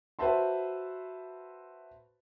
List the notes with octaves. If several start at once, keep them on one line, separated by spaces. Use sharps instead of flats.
F#4 B4 C5 E5 A5 C6